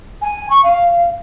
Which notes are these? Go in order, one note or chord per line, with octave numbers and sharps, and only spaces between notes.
G#5
C#6
F5